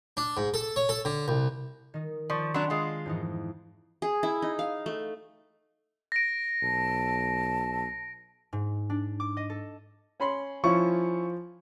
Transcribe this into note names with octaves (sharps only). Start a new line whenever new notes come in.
D4
G#2
A4
C#5
A4
D3
C2
D#3 D#4
F3 D5 C#6
F#3 D4 F#5 B5 C6
G#3 F4
F2 G#2 E3 D#4
G#4
E4
D#4
F5
A3
A#6 D7
B1 A5
G#2
D4
D6
D#5
A4
C#4 B5 C6
F3 C#4 E4 F4 C#6